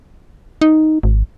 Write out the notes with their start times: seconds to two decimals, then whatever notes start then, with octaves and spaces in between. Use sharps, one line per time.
0.61 D#4
1.03 G#1